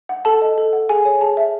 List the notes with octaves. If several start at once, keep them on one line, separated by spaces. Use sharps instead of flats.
F#5
A4 A5
D#5
A4
F#5
G#4 G#5
C#5
G#4 A5
E5